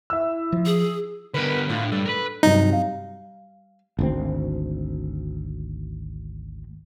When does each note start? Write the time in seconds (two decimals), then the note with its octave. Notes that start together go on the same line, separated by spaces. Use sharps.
0.10 E4 E5 E6
0.52 F3
0.66 G#4
1.34 D3 B3 A#4 B4
1.69 A2 D3 F4
1.92 G2 A4 D5
2.06 A#4 B4
2.43 G2 C3 F#3 D#4
2.73 F5
3.99 G#1 D2 C4